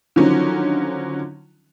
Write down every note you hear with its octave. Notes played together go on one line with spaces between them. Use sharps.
D3 D#3 F3 F#3 C#4 D#4